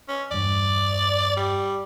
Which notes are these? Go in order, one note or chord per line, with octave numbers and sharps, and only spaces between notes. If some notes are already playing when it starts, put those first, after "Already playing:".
C#4
E2 G2 D5
G3